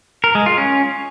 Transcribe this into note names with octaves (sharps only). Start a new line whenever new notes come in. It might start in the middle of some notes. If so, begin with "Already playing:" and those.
A#4
G#3
F4
C#4